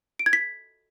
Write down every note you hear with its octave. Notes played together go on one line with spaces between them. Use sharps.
D7
G#6
B6